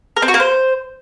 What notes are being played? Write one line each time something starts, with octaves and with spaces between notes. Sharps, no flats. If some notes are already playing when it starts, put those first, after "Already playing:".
A#4
C4
F#4
A#3
C5